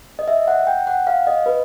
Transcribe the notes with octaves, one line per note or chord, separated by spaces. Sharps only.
D#5
E5
F#5
G5
F#5
F5
D#5
B4